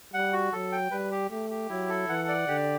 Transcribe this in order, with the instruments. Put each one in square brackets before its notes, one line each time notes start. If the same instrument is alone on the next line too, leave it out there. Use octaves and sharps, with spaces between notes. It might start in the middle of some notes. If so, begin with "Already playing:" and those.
[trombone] G3 [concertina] F#5
[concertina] F#4
[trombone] F#3 [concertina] A4
[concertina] G5
[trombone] G3 [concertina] B4
[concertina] G4
[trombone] A3 [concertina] G4
[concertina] G4
[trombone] F#3 [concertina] E4
[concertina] A4
[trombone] E3 [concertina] F#5
[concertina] D5
[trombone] D3 [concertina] G4